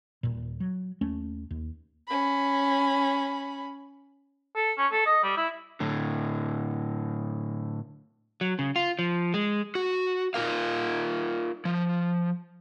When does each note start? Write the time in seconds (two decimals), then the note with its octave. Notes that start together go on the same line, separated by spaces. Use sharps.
0.23 D#1 A#2
0.60 F#3
1.01 D#2 A3 C#4
1.51 D#2
2.08 C#4 B5
4.56 A4
4.78 C#4
4.92 A4
5.06 D#5
5.23 G3
5.37 E4
5.80 A2 D3
8.41 F#3
8.59 C#3
8.76 F4
8.99 F3
9.34 G#3
9.75 F#4
10.34 D#4 F4 A#4 F5
11.65 F3